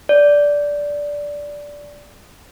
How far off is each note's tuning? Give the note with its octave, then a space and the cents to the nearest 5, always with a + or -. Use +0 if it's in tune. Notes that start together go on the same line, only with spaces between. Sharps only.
D5 -10